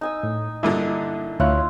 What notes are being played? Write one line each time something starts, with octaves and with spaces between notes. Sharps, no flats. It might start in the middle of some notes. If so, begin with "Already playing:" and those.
D#4 G#5 E6
A2
G2 A#2 D3 E4 E5
D2 E4 F4 C#5 F#6